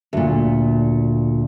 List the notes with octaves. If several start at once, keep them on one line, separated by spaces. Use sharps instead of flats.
D2 A#2